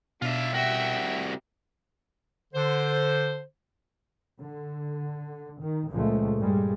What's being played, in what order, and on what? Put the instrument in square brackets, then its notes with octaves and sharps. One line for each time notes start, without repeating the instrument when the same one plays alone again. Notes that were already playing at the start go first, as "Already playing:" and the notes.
[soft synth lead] B2 [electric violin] D4 [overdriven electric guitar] F4 E5
[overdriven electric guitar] C2 F#4 [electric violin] E5 G5
[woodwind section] D3 C5
[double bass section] D3
D#3
C#2 A#2 C#3 F3 G#3 A3
G2 A#2 G3 G#3